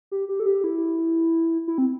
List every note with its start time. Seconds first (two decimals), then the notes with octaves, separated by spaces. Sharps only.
0.11 G4
0.29 G4
0.40 A4
0.46 G4
0.64 E4
1.68 E4
1.78 C4